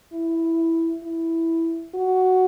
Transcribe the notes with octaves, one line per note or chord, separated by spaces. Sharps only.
E4
E4
F#4